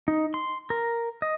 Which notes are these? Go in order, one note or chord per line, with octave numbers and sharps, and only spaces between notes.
D#4
C6
A#4
D#5